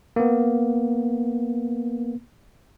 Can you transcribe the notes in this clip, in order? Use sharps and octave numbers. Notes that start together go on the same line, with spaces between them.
A#3 B3